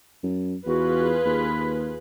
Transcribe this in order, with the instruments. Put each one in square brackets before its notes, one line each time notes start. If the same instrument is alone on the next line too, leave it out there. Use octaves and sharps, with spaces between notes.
[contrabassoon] F#2
[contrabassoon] E2 [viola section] F4 G#4 B4 [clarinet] F#4
[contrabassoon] D#2 [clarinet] B5